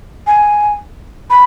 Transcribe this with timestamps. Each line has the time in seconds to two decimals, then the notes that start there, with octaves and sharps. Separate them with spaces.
0.27 G#5
1.30 B5